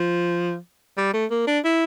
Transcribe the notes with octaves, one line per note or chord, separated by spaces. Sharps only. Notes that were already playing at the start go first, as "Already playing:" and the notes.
Already playing: F3
G3
A3
A#3
D4
E4